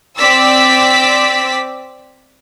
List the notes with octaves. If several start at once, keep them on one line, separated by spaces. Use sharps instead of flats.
C4 D5 E6 B6